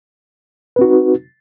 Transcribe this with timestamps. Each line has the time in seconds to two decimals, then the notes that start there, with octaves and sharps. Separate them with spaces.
0.76 B4
0.79 C4
0.81 F#4
0.84 D#4